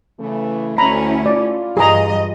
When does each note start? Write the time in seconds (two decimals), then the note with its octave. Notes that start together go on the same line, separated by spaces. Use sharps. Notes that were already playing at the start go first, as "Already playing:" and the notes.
0.19 C#3 E3 A3
0.78 D2 A3 C#4 E4 A#5 B5
1.26 F4 D5
1.77 G2 E3 G#4 D#5 G#5 A#5